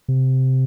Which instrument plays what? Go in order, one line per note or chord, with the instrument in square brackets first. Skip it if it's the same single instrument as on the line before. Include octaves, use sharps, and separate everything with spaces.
[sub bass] C3